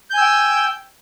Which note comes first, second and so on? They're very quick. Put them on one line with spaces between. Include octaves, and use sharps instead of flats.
G6 G#5 E6 G5